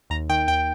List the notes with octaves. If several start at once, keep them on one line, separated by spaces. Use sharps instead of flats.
D#2 A#5
D#3 G5
D#2 G5